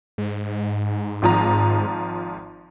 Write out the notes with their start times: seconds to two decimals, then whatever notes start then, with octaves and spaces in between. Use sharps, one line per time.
0.18 G#2
1.22 G#1 F3 A#5